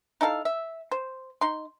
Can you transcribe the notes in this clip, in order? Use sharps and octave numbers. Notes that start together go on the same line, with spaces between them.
D#4 E4 A4 F5
E5
C5
D#4 C6